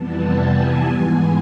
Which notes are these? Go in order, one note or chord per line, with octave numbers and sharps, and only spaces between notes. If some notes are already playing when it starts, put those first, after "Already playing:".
Already playing: F2 C3 E3 G3 B3 A5
G#5
G#2 E3 G#3 B3